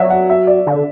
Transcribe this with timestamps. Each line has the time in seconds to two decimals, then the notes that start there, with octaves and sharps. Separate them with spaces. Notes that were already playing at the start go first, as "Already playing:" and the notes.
Already playing: F#3 D5 E5
0.10 F#5
0.30 E5
0.47 D5
0.67 D3